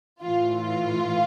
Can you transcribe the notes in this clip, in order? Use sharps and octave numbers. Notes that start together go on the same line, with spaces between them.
A2 E3 F4
F4